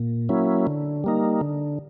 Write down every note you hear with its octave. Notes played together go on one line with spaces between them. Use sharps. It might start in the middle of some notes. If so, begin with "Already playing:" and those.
Already playing: A#2
F#3 A#3 C#4 E4
D3
G3 A#3 D#4
D3